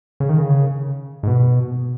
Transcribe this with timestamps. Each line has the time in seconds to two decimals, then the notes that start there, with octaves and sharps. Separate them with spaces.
0.20 C#3
0.29 D#3
0.38 C#3
1.23 G#2
1.27 B2